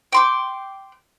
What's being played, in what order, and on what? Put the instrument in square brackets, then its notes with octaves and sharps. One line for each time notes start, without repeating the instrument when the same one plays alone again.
[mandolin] G5 C6 D6